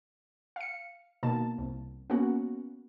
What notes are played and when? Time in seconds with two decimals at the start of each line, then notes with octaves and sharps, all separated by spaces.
0.56 F5 C#7
1.23 B2 D#3 A#3 A5
1.58 C2
2.10 A#3 B3 C#4 F#4